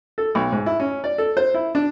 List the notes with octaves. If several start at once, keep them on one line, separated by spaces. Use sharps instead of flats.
A4
B1
G#2
E4
C#4
D5
A4
C5
E4
D4